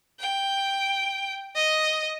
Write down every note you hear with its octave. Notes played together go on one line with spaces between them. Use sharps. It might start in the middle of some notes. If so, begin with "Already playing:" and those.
G5
D#5